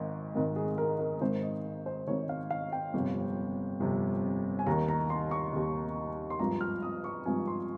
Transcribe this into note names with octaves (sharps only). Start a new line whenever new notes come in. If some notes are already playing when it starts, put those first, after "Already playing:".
Already playing: G#1 G#2 D#3
G#1 G#2 D#3 A#4
G#4
A#4
A#4
G#1 G#2 D#3 C5
D#5
C5
G#1 G#2 D#3 C#5
F5
F5
G5
G1 F2 C3
G1 F2 C3
G#5
D#2 D#3 A#5
A#5
C6
C#6
D#2 D#3
C6
G#1 G2 F3 A#5
F6
D#6
C#6
G#1 G2 F3 G#5
C6